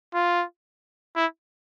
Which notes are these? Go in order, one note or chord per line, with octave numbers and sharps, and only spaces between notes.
F4
E4